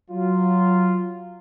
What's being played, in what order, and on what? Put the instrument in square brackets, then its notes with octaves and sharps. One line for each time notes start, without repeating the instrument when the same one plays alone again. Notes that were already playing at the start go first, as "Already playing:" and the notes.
[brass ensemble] F#3 F4